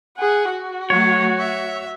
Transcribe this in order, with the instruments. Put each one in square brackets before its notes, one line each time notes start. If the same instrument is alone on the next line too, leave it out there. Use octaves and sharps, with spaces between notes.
[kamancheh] G#4 F#5
F#4
[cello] F#3 A3 [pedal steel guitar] C#5
[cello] E5